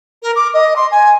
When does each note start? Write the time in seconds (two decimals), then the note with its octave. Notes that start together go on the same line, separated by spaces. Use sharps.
0.22 A#4
0.36 D6
0.53 D#5
0.76 C6
0.91 G#5